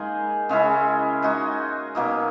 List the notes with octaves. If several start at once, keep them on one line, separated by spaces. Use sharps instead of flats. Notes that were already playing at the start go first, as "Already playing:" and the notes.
Already playing: G#3 A#3 D#4 G#4
C#3 G#3 C#4 E4
G#3 D#4 F#4
B2 F#3 A#3 D#4